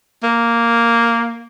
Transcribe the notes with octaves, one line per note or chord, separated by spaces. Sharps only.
A#3